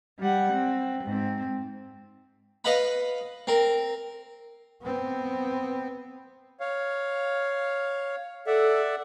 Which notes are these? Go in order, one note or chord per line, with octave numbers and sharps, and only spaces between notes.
G3 F#5
C4
G#2 C4
B4 D#5 F5 F#5 B5
C4 A#4
B3 C4
C#5 F5
A4 D5 E5 F#5